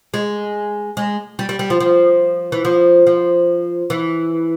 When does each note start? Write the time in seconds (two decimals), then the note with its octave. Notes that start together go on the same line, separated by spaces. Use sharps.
0.14 G#3
0.97 G#3
1.39 G3
1.49 G3
1.59 G3
1.70 F3
1.80 F3
2.52 E3
2.65 F3
3.07 F3
3.90 E3